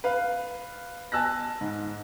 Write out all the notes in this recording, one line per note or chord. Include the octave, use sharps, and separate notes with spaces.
B4 F5
G#5 A5 E6 F#6 A#6
G#2